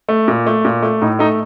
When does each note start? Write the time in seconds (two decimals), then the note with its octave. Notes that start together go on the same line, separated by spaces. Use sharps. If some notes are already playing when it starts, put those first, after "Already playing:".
0.09 A3
0.28 A#2
0.46 A3
0.65 A#2
0.82 A3
1.02 A2 D#4
1.19 A3 D#4